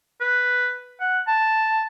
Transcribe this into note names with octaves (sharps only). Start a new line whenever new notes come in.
B4
F#5
A5